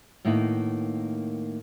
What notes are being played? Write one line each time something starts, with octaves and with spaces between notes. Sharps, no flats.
A2 D#3 A#3 B3 D#4 B4